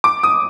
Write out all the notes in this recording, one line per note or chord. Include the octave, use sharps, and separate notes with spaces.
D6
D#6